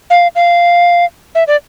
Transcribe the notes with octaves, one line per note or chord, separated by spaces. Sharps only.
F5
F5
E5
D5